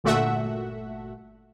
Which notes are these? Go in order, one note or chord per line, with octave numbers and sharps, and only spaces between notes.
G1 A#2 A3 F#4 E5 F#5